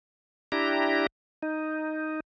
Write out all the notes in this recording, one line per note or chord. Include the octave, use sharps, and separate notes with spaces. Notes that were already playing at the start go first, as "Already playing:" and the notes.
D4 E4 G4 A#5
D#4